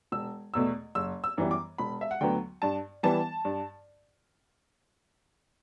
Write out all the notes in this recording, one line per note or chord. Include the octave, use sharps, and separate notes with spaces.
E1 E6
E2 B2 A3 E6
F#1 E6
E6
F#2 E3 G3 B3
D6
E1 B5
E5
F#5
D2 D3 F#3 B3 G5
G2 A5
E3 G3 B3 A5
G2